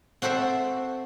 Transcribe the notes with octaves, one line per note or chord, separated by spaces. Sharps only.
C4 F#4 A4 C5 E5